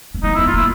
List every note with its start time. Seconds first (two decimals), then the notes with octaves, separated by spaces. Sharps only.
0.14 A3
0.23 A#3 D#4
0.35 E4
0.39 B3
0.47 F4
0.54 A#3 E4